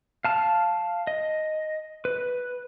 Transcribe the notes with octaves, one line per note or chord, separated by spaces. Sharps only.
F5 A5 F6
D#5
B4